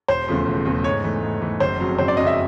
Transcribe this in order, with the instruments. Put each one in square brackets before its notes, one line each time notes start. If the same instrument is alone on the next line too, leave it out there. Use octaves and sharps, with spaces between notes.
[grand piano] E1 [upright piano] C5
[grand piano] E2 C#3 F3 A3
E1
E2 C#3 F3 A3
[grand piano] G#2 [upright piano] C#5
[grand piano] E3 A3
G#2
E3 A3
[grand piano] F#1 [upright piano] C5
[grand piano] F2 C#3 F#3
[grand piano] F#1 [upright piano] C5
[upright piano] D5
[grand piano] F2 C#3 F#3 [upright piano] D#5
[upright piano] E5